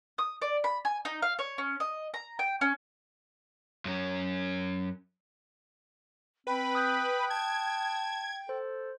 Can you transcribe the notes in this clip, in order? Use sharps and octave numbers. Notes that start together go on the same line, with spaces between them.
D#6
D5
B5
G#5
D#4
F5
C#5
C#4
D#5
A#5
G5
C#4
F#2 C#4
C4 B4 G5 B5
D#6 F#6 G6
A5 G#6
A4 C5